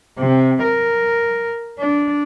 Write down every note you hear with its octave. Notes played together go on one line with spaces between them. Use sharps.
C3
A#4
D4